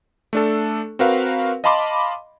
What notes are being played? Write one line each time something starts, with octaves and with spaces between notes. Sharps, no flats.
A3 D4 A4
C4 F#4 A#4 B4 F5
D#5 F5 A5 B5 C6 D6